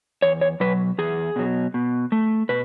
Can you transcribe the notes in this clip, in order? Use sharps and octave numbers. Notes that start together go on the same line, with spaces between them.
E2 C#5
C#5
B2 F#3 B4
E2 G#4
B2 F#3
B2
A3
B2 B4